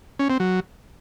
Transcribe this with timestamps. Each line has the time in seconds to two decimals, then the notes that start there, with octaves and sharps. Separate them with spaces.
0.19 C#4
0.30 C4
0.40 F#3